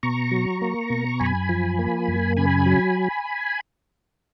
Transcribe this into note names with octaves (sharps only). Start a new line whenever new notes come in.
B2 A#5 C#6
F#3
A#3
B2
F#2 G#5 B5
F3
A#3
F#2
C#3 G#5 B5
F#3